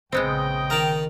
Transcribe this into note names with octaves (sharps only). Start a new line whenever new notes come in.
A#1 C#3 G#3 B3 C4 D#5 G5
D#3 A#4 A5 A#5